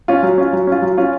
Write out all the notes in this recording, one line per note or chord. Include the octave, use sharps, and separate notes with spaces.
C#4 F4
F#3
C#4 F4
F#3
C#4 F4
F#3
C#4 F4